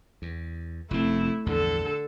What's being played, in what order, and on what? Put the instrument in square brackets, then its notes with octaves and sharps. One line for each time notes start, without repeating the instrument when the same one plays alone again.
[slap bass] E2
[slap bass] F1 F#2 C4 [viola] A3 E4
[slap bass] A#1 E2 G2 [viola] D3 A4